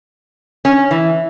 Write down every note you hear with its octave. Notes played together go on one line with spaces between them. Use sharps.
C#4
E3